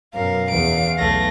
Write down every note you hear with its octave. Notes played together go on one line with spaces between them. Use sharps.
F#2 B2 A#4 F5
E2 D7
B1 E2 A3 A#6